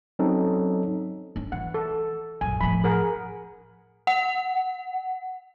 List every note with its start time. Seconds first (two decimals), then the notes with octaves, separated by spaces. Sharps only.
0.19 F#3 C4 C#4 D#4 A4
1.36 C#4 D4
1.52 E3 F#5
1.74 A4
2.41 A#1 F#2 G#5
2.61 A2 F3 B5
2.84 G#4 A#4 F#5
4.07 F#5